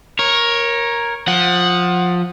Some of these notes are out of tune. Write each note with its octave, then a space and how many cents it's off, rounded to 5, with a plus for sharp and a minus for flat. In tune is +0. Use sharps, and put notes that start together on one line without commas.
A#4 +10 C#5 -10
F3 +20 F#5 +0